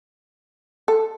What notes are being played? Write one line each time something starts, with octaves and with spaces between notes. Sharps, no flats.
A4